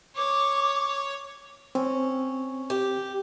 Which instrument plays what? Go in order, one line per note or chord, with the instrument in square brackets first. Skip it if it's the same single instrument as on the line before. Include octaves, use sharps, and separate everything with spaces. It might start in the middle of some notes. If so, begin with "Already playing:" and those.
[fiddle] C#5 [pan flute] D6
[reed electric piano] C4 [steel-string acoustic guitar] C#4
[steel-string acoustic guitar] G4